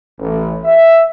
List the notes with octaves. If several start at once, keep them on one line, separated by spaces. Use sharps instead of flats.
A1
E5